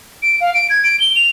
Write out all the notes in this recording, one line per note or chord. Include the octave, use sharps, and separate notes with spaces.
D7
F5
D7
G#6
D7
G7
F7